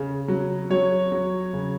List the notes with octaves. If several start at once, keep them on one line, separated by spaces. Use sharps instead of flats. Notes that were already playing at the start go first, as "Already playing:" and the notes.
Already playing: C#3
F#3
F#3 C#5
F#3
C#3